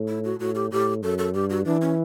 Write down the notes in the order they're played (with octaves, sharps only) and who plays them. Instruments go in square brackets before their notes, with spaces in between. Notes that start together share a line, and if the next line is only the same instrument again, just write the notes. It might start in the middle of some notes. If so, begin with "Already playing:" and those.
Already playing: [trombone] A2
[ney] E4
F#4
[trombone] A2 [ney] F#4
[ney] G4
[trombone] A2 [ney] G4
[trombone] F#2 [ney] A4
[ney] A4
[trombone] G2 [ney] G4
[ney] F#4
[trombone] E3 [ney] D4
[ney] C#4